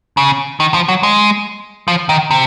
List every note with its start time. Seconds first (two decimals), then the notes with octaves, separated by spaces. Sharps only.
0.17 C#3
0.60 D#3
0.74 F3
0.88 F#3
1.03 G#3
1.88 F3
2.09 D#3
2.31 C3